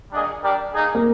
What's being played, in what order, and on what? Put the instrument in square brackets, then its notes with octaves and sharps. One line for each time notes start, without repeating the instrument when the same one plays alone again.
[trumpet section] G3 A#3 D4 G#4 D#5
G3 D4 G4 A#4 D5
A#3 D#4 G#4
[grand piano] A#3